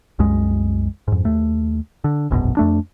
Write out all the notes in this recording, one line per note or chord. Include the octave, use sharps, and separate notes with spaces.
C2 F#2 G#3
F2 G#2
D#2 A3
D3
E1 A#1 F#2 B2
F2 A3 D4